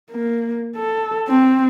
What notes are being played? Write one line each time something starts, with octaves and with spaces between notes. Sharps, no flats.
A#3
A4
C4